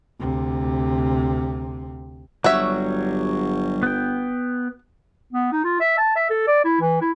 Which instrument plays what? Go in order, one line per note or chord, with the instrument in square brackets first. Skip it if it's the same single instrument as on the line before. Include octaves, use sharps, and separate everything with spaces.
[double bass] D2 C3
[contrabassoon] G1 [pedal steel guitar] F#3 G3 C#5 [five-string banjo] F#4 E5
[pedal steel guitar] B3 G5
[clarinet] B3
D#4
F4
E5
A5
E5
A4
D5
E4
E3
E4